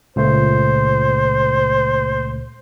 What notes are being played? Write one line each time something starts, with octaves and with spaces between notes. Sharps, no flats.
C#2 A#2 A3 C5